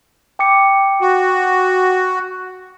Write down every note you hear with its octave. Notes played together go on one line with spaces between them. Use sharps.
G5 D6 C#7
F#4